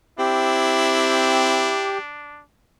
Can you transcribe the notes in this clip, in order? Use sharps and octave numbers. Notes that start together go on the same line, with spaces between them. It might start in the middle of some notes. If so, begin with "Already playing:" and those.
C4 D4 E4 G4